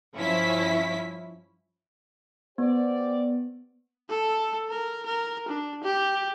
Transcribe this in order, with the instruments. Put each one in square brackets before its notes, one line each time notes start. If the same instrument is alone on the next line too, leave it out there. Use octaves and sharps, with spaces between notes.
[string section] G2 F3 C#4 E4 B6
[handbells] B3 [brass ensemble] G4 C5 D5
[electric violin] A4
A#4
A#4
D4
G4